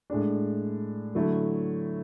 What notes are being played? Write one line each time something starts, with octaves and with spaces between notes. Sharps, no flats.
A2 G#3 D4
D3 F#3 A3 E4